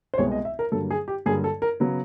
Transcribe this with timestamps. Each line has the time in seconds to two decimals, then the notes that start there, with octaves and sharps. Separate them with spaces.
0.14 C5
0.18 C2 B2 G#3 B3 C#5
0.31 D#5
0.45 E5
0.59 A#4
0.72 G2 D3 F#3 A#3 A4
0.91 G#4
1.08 G4
1.26 G2 D3 F#3 A#3 G#4
1.44 A4
1.62 A#4
1.80 C#3 F#3 B3